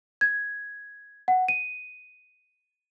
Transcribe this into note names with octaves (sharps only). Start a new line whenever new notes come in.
G#6
F#5
D#7